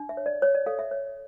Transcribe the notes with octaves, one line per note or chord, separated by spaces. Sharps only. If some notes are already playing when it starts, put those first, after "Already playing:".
Already playing: D4
E5
C#5
D5
C#5
D5
A4 F5
E5
C#5